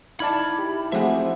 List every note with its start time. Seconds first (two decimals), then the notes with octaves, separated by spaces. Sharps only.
0.20 D#4 E4 D5 A5 B5 D6 F6 G#6
0.59 G4
0.92 F3 A3 C4 F#4 G#4 C5 E5 F#5